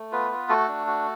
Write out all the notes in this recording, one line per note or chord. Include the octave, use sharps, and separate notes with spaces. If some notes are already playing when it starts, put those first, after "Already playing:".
Already playing: A3
B3 F4 B4
F4
A3 F#4 A4
D4
F#4